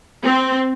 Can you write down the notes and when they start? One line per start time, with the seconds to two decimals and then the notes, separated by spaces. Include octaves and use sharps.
0.23 C4